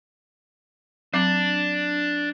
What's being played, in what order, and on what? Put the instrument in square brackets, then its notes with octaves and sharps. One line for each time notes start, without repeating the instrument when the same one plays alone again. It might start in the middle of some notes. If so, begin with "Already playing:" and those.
[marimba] F#3 C4 D6 [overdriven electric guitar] D4